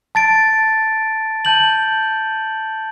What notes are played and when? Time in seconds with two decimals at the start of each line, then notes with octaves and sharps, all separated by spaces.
0.15 A5 A6 D7
1.45 A5 G6 F#7